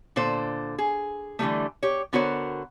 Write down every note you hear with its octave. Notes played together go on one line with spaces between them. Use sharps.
A#2 D3 A4 C5
G#4
D3 E3 G3 A3
G4 C#5
D3 B3 F#4 A#4 C5 C#5